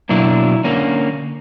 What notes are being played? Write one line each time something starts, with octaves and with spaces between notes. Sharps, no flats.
B2 F#3 A#3 D4 E4
D3 A#3 C#4